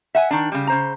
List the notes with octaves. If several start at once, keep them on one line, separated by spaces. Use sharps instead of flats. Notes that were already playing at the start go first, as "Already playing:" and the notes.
E5 F#5 G#5
D#3 D4
C#3 G3
C#3 C5 A#5